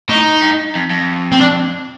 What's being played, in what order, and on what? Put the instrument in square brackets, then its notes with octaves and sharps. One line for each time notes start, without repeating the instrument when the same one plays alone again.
[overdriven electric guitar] A2 [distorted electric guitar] D#4
[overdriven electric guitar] G2
F2
F2
[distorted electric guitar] C4
D4